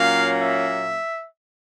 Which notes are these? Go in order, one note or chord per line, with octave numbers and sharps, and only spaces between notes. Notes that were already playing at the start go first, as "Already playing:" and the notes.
Already playing: A#2 F#3 A#3 C#4 F5
E5